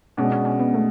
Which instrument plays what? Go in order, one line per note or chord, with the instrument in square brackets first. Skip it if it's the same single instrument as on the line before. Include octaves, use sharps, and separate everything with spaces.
[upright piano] B2 G#3 D4 [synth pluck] C#4
[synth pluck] C#4
C#4
B3
A3